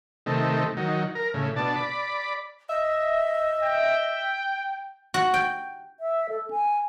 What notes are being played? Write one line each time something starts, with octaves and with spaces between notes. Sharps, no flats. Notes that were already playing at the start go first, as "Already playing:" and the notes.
C3 D#3 A3
D#3 F#3
A#4
A2 C#3
B2 D4 A5
D5 B5
D#5 E5
G5
F#4
G5
E5
A4
G#5